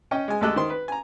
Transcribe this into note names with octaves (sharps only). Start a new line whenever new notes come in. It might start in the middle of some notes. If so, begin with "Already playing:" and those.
C#4 D#5 G5
G#3 G#5
D2 G#3 G4 A4 D#5 F#6
D#3 C5 C6
B4
G#5 A#5